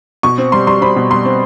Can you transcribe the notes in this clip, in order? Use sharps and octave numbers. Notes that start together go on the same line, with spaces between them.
B2 C#6
C4
G3 C6
G3 C6
C4 B5
B2
G3 C6
C4